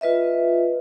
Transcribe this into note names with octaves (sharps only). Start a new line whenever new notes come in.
F4 B4 D#5 E5